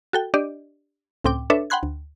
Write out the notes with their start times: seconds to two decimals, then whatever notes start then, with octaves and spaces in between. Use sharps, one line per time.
0.13 F#4 A4 G5
0.34 D4 G4 D5 D#5
1.24 C#2 A2 C4 G5 D6
1.50 D4 A4 B4 C#5 E5
1.70 F#5 G5 B5 C6 F#6 G#6
1.83 D2